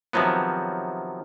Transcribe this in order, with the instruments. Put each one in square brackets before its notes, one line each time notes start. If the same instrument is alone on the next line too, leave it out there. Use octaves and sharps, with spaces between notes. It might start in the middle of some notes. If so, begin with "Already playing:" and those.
[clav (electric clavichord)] C3 D#3 F3 F#3 B3